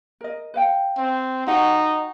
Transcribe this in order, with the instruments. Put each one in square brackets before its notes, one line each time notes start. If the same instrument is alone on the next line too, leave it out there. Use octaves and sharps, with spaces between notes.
[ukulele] A#4 D#5
B4 F5 G5
[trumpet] C4
[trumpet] D#4 [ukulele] F#4 G4 F#5